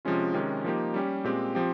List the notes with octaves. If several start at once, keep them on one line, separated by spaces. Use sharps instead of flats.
C3 F3 G#3 C#4 F4
C3 D#3 G#3 C#4 G4
F3 A#3 D#4 G4
G3 C#4 G4
A#2 G#3 C4 G4
F3 C4 G4